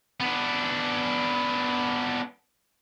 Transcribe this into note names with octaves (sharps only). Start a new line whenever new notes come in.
B3 D4